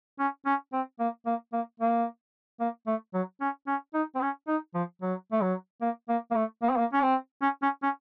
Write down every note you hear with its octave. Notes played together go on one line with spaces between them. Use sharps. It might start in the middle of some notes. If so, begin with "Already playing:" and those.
C#4
C#4
C4
A#3
A#3
A#3
A#3
A#3
A3
F#3
C#4
C#4
D#4
C4
C#4
D#4
F3
F#3
A3
F#3
A#3
A#3
A#3
A3
A#3
C4
A#3
C#4
C4
C#4
C#4
C#4